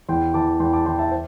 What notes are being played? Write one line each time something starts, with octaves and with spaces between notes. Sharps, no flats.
E2 G5 C6
E3 A5 D6
E2 G5 C6
A5 D6
E3 G5 C6
E5 A5
C5